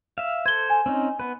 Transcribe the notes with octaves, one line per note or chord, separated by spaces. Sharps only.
E5 F5
A4 C5 G#6 G7
G#5
C4 C#4 D#4
B3 B4